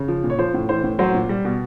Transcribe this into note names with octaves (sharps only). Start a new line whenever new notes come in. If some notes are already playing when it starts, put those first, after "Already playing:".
Already playing: C#3
F3
A#2
C#5
F3 C5
A2
E3 C5
A2
F#3 C5
A#2
G3
B2